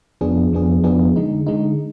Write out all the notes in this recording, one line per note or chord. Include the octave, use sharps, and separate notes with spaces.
F2 F3 B3 D4 G#4
F2 F3 B3 D4 G#4
F2 F3 B3 D4 G#4
D3 G#3 D#4
D3 G#3 D#4